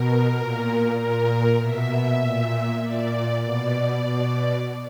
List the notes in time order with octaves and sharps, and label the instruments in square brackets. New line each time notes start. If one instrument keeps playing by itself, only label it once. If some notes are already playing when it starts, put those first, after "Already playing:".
Already playing: [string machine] B2 A#4
A#2
A#2 A#4
B2 E5
A#2
A#2 D5
B2 D5
B2